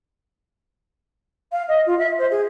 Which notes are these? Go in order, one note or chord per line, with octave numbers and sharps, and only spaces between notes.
F5
D#5
F4
E5
C5
G#4